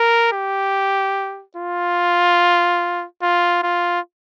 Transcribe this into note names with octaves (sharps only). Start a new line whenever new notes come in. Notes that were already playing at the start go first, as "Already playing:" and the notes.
Already playing: A#4
G4
F4
F4
F4